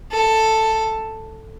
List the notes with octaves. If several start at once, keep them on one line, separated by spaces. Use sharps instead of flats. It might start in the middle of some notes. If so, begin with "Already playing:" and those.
A4